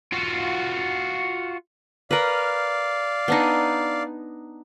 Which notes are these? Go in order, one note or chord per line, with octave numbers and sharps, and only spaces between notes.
F4 F#4
A#4 B4 D5 F5
B3 D4 D#4